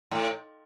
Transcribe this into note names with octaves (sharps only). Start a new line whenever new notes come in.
A2